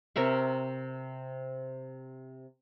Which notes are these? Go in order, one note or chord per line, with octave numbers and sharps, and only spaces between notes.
C3 A#4 E5 C#6